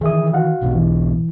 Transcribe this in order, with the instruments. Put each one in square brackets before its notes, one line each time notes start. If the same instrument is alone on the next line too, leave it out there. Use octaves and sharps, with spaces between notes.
[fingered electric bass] D#3 E3 [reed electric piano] G#4 E5 D#6
[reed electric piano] F#4 F5 F#5
[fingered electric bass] B1 G#2 B2
[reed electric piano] E3